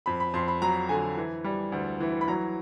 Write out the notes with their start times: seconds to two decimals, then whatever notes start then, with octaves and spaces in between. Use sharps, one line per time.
0.06 F2 B5
0.20 B5
0.33 F2 C6
0.48 B5
0.62 F#3 A#5
0.89 D3 G#5
1.17 E3
1.44 G3
1.72 D2
2.00 E3
2.21 B5
2.28 F#3 A#5